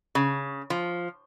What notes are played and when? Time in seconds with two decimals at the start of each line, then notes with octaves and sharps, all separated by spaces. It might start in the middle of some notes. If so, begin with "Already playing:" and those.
0.15 C#3
0.70 F3